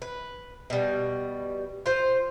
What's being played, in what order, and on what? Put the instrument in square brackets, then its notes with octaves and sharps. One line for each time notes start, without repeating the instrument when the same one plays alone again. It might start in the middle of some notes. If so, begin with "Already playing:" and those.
[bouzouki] B4
B2 G3
F4 C5